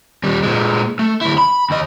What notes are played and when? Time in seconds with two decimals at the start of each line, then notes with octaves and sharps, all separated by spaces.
0.23 D#2 G3
0.43 A#2 G#3
0.99 A3
1.21 D2 E4
1.38 B5
1.70 D#2 D#5